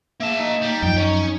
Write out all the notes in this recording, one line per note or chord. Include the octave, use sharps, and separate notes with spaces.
A#3 E5 A5
D#4
G3
F#2 F3 G5
C#4 C#5